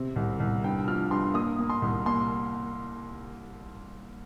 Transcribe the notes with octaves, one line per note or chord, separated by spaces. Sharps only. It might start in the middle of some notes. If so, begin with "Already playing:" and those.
Already playing: C3 C4
C2
C2
G2 G5
F3 F6
G2 C6
A#3 D#6
A#3
C6
C2
A#3 C6